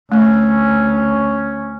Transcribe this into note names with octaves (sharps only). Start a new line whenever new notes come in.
D2 A3 C#4